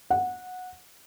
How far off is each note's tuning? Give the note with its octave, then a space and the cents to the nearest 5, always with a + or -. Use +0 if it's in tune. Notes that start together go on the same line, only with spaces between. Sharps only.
F#5 -15